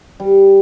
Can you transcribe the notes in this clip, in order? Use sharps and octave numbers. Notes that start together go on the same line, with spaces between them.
G3